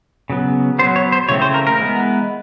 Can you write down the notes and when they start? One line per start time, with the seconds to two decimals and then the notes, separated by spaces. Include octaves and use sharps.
0.30 C#3 F#3 B3
0.79 B3 C5
0.83 F#3
0.96 C#5
1.12 C5
1.29 C#3 E3 A3 C4 C#5
1.42 C5
1.54 A#4
1.67 A#4
1.79 E3 G#3 B3